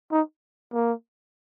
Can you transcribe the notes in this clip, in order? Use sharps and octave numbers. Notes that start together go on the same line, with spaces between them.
D#4
A#3